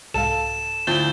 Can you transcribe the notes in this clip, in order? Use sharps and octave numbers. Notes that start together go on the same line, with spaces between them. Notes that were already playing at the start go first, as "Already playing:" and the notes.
C2 G#2 A4 F5 E7
D2 F3 E4 G6 A6 G7